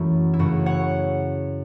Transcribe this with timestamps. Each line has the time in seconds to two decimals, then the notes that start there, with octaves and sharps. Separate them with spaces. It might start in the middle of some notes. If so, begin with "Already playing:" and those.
Already playing: F#2 E3 A3 E4 F#4
0.34 E4
0.39 F#2 C#3 A3 F#4
0.66 C#5 F#5